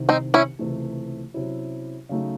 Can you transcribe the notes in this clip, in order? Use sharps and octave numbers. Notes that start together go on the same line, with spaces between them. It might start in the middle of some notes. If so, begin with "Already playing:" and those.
Already playing: C2 C3 D#3
C4 D#4
C#4 E4
C#2 C3 E3 A3
C3 F#3 C#4 E4
C#3 F#3 A3 D#4